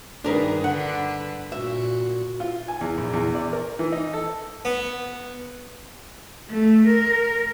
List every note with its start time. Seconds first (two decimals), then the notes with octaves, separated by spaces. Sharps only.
0.24 G2 D#3 D4 G#4 A#4 B4
0.64 D3 B4 F#5
1.52 A#2 F#4 E5
2.40 F4
2.68 G#5
2.81 E2
2.98 A#1
3.13 E2
3.35 D5
3.53 A#4
3.79 E3
3.92 D#4
4.13 A4
4.65 B3
6.50 A3
6.86 A#4